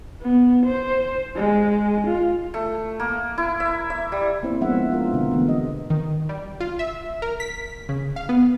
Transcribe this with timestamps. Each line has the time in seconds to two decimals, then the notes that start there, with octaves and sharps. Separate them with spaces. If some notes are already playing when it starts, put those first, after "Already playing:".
0.21 B3
0.66 C5
1.36 G#3
2.07 F4
2.54 A3
3.00 A#3
3.38 E4
3.60 E5
3.90 E5
4.12 G3
4.43 A#3 C4 E4 C5 C#5
4.61 F3 G#3 B3 D4 E5 F#5
4.90 D4 F4 A#4
5.13 B2 D3 F5
5.31 D3 E3 A3 B3
5.48 G4 D#5
5.90 D#3
6.29 G3
6.60 F4
6.79 E5
7.22 A#4
7.40 B6
7.89 C#3
8.16 F5
8.29 B3